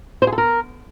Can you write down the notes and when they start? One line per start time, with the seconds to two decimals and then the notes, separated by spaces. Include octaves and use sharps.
0.22 C5
0.27 G#4
0.32 A4
0.38 A#4